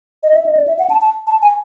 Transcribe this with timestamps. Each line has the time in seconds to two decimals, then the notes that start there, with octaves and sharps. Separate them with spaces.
0.23 D#5
0.34 E5
0.46 D#5
0.57 D5
0.68 E5
0.79 F#5
0.90 A5
1.01 A5
1.27 A5
1.42 G#5